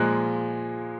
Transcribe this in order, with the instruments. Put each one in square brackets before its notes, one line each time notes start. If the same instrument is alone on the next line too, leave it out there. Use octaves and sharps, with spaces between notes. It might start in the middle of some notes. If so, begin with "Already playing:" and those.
Already playing: [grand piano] A#2 F3 G#3 F#6